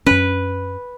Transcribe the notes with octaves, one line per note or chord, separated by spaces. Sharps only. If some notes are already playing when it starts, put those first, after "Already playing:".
F#2 C#4 B4